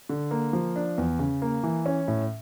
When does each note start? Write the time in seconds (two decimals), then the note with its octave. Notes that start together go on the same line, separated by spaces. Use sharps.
0.09 D3
0.31 A#3
0.53 F3
0.76 D4
0.98 E2
1.19 C#3
1.42 A#3
1.64 E3
1.86 C#4
2.08 A2